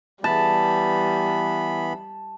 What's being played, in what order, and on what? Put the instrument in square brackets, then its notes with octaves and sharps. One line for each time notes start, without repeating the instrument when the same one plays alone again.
[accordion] E3 B3 B5 [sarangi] G3 [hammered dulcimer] A5